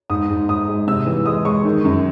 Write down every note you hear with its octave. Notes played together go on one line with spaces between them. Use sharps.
G#2 D#6
G#2
G#2 D#6
G#3
C3 E6
E3
G#3 D#6
G#3 C#6
D#3
F#2